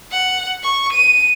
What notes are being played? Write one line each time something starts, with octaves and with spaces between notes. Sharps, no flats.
F#5
C#6
D#7